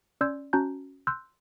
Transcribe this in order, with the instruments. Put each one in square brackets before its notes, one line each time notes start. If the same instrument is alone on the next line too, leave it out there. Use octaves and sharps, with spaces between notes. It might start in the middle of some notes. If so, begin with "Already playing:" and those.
[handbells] C#4 D5 C6 E6 G6 G#6
C#4 F#4 A5 A#5 F#6 G6
C6 E6 F#6 G6